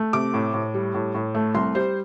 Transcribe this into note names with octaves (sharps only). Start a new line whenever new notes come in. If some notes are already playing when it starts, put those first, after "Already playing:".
Already playing: A3
C3 D6
A2
A2
G3
A2
A2
A3
C2 C6
G3 C5